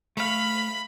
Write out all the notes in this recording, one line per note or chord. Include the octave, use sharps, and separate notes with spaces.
A3 F5 B5